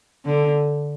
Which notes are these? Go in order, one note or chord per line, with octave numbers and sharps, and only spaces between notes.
D3